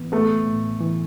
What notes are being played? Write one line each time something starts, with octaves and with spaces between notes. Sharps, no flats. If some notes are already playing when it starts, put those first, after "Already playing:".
Already playing: A2 E3 B3
A3 B3
A2
E3